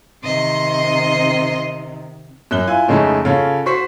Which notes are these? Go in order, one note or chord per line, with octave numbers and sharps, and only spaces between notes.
C3 D#3 D#5 C6
F#2 F#6 G7
E4 F4 G#5
F2 C#3 G#3 A3 C#4 D#4
C#3 F4 A4 C#5 F5
F#4 C5 C#6 B6 C7